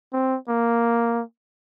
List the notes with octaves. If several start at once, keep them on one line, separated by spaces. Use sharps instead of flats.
C4
A#3